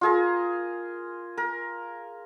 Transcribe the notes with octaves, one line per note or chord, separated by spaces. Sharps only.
F4 G#4 A#4
A#4